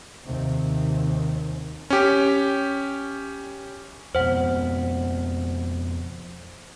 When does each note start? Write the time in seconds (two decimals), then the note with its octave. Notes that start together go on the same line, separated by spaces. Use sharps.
0.24 D#2 C3
1.90 C#4 G4
4.15 F2 B2 C5 F#5